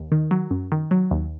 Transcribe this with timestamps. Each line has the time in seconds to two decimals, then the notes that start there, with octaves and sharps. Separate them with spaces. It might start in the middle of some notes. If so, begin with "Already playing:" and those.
Already playing: D#2
0.12 D#3
0.31 F#3
0.51 F#2
0.72 D#3
0.91 F#3
1.11 D#2